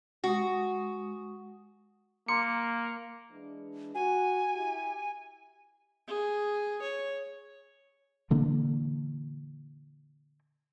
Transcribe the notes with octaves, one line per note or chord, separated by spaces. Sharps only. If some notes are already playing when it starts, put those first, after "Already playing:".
G#3 F#4 D#6
A#3 A#5 C6 D6 C#7
E3 G#3 D4
F#4 G#5
E4 G4
G#4
C#5
A#2 D3 E3 A#3